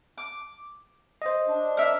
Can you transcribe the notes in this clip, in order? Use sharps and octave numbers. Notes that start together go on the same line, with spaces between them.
D6
C5 D#5
D4
A#4 E5